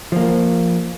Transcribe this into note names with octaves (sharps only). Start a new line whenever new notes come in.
F3 A#3